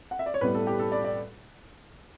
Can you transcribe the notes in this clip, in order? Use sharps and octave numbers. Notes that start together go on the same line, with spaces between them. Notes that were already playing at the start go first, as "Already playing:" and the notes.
F#5
E5
D5
C#5
A2 G3 B3 B4
A4
G4
A4
D5
D5